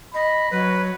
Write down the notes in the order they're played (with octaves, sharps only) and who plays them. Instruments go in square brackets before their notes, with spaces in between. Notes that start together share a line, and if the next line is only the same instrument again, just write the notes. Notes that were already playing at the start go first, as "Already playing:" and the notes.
[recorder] D#5 [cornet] B5
[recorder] F#3 [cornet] B4